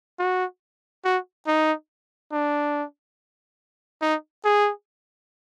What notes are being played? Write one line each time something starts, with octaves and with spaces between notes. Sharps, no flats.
F#4
F#4
D#4
D4
D#4
G#4